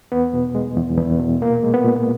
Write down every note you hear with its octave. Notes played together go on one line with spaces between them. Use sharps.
E2 B3
B2
G#3
E2
E2
B2
A#2 A#3
G#3
B3
A#2